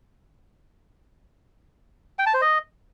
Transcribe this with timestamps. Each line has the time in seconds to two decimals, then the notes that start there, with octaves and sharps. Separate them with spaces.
2.19 G5
2.26 A5
2.34 C5
2.41 D#5